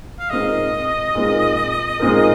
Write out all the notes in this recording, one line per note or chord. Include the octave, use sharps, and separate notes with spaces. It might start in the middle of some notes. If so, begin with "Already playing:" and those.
F5
A#2 G#3 C4 D#4 A#4 D#5
A#2 G#3 C4 D#4 A#4
A#2 G#3 C4 D#4 A#4